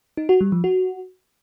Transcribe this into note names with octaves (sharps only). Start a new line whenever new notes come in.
D#4
F#4
G3
F3
F#4